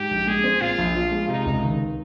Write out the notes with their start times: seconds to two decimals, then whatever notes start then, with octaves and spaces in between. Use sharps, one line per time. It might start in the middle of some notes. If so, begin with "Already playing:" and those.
Already playing: G#2 G4
0.11 A#1
0.27 G#3 G#4
0.44 C4
0.61 A#2 F4
0.78 A#1
0.95 F3
1.11 G#3
1.28 C3 D#4
1.46 C#2
1.62 D#3